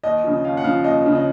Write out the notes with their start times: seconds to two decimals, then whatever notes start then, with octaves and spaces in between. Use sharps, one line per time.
0.03 D#2 D#5
0.24 C#3 F3
0.44 D#2 F5
0.57 F#5
0.64 C#3 F3 F5
0.84 D#2 D#5
1.05 C#3 F3
1.15 D#5